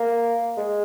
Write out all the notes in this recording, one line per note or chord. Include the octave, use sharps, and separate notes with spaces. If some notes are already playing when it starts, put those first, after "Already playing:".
Already playing: A#3
G#3